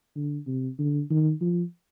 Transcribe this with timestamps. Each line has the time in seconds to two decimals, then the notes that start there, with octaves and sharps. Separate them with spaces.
0.16 D3
0.47 C3
0.79 D3
1.10 D#3
1.41 F3